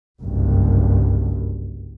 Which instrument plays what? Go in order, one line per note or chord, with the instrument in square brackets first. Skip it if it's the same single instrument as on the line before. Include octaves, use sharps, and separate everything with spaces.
[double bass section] F#1 C2 G2